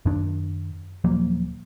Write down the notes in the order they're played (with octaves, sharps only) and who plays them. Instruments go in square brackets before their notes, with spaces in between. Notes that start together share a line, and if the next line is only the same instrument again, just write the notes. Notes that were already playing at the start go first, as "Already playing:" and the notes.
[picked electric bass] F#2 D#3 D4
D#1 F3 F#3 A#3